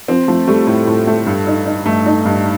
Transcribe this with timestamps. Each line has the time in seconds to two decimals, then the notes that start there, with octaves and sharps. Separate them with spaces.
0.08 F3 C4
0.28 F3 A3
0.48 G3 A3
0.67 A2
0.87 A2
1.07 A3
1.27 G2
1.47 D#4
1.66 D#4
1.85 G2 A3
2.06 D#4
2.25 G2